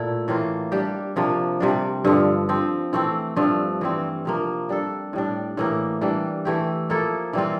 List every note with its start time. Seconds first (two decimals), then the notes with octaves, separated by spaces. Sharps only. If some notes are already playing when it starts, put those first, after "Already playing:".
Already playing: A#2 A3 E4
0.28 A2 E3 A#3 F4
0.72 G3 D4 G4
1.16 C3 F3 A#3 D4
1.60 C3 G3 D4
2.05 G2 D3 F3
2.49 F3 C4 G4
2.93 E3 A3 C4
3.36 G2 F3 A3 D4
3.81 E3 G3 C4
4.25 C3 F3 A#3
4.69 G3 D4 A4
5.13 A2 G3 D4
5.57 A2 E3 A#3
6.01 E3 G3 D4
6.45 E3 A3 E4 G4
6.89 F3 A#3 E4 A4
7.33 E3 G3 C4 F4